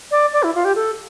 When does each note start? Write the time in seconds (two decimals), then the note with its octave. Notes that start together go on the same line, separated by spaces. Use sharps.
0.11 D5
0.33 D5
0.43 E4
0.55 F4
0.65 G4
0.76 A4